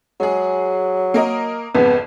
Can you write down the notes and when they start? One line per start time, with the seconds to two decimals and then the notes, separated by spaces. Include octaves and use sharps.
0.20 F#3 G#3 G#4
1.14 A#3 A#4 D#5
1.74 G#1 F2 C#3 B3